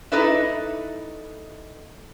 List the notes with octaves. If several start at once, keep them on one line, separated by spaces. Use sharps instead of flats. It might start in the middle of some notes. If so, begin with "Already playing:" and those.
D#4 E4 A4 B4 D5 E5